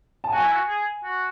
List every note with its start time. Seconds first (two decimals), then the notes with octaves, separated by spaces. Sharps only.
0.24 A5
0.32 F#4 G#5
0.43 E4
0.53 F#4
0.68 G#4
1.04 F#4